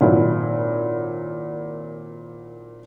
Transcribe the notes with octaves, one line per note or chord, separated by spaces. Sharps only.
G#1 A#2 F#3 E4